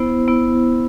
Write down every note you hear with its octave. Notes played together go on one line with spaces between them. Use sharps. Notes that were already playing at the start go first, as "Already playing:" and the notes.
Already playing: B3 E4 C5
B3 E4